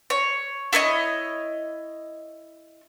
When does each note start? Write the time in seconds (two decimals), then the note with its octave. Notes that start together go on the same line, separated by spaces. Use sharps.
0.10 C#5
0.73 E4 A4 C#5 D#5